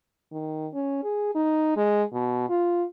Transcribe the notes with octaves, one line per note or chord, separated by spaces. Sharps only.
D#3
C#4
G#4
D#4
G#3
B2
F4